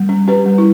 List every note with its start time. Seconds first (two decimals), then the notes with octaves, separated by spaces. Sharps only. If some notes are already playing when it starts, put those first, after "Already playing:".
Already playing: G3
0.09 C#4
0.28 C#4 G4 B4
0.46 G3
0.58 E4